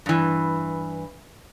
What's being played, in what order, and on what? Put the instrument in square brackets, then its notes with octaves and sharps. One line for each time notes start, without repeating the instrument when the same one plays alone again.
[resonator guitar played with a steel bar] G2 E3